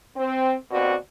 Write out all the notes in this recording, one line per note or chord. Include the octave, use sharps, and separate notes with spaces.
C4
D#2 B2 C4 F#4 D5